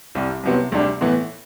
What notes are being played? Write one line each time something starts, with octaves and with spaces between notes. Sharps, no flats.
C2 C3 G3
C2 C3 F#3 B3
D2 C3 G3 D4
A2 E3 B3